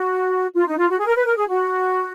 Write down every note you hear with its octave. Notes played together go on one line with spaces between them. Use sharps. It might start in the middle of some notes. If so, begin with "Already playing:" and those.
Already playing: F#4
F4
D#4
F4
F#4
G#4
A#4
B4
A#4
G#4
F#4